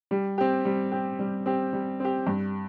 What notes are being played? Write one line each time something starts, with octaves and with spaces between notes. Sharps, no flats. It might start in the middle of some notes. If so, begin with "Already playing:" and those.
G3
C4 G4
G3
C4 G4
G3
C4 G4
G3
C4 G4
G2